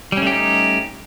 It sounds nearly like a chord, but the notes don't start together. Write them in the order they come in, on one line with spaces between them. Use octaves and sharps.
G3 C#4 A3 G4 D#4